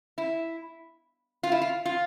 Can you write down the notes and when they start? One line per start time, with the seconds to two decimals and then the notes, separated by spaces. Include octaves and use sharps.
0.18 E4
1.43 F4
1.52 E4
1.61 F4
1.85 F4